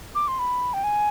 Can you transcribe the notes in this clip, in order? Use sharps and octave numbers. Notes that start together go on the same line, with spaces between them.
D6
C6
B5
G5
G#5